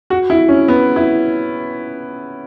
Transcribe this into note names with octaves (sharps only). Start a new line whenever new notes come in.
F#4
E4
C#4
B3
E4